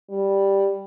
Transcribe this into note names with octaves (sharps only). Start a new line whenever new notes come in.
G3